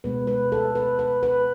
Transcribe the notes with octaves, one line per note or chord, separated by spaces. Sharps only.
B2 G#3 B3 B4
B4
A4
B4
B4
B4